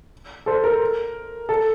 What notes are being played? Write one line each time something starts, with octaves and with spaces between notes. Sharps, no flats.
A4 C5
A#4
A4